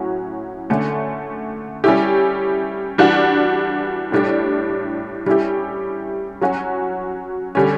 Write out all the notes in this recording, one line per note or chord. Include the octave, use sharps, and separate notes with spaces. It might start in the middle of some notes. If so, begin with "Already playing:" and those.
Already playing: A2 F#3 C#4 F#4
D3 A3 C#4
G3 C#4 E4 G4
E3 G3 D4 F#4
A2 G3 D4 G4
G3 C#4 E4 G4
F#3 C#4 F#4
D3 G3 C#4